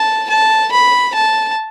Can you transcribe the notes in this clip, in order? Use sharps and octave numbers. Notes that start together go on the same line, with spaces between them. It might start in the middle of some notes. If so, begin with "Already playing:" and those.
Already playing: A5
A5
B5
A5